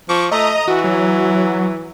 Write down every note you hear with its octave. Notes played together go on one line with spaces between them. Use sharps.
F3 C#6 D6
A3 D#5 A#5 D#6
E3 F#4
F#3